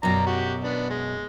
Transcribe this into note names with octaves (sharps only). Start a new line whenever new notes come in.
F#2 B2 D5 A#5
F#4 G4
B3 D4
G#3